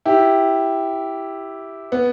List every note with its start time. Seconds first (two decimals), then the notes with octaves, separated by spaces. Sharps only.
0.06 E4 G4
1.92 B3